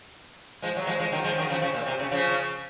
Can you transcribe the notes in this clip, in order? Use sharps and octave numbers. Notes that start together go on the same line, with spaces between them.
F3 G#3
F#3
F3 G#3
F3 G#3
D#3 F#3
F3 G#3
D#3 F#3
C#3 F3
C#3 F3
A#2
C3
C#3
C#3 F3